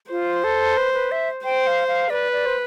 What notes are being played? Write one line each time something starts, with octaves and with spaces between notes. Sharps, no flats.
F4 C5
A4
B4
B4
E5
C5 G5
F5
F5
B4 D5
D5
C5